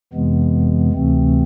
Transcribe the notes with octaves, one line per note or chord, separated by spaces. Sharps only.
F2 C3 E3 G#3 B3
D2 C3 E3 A3 C4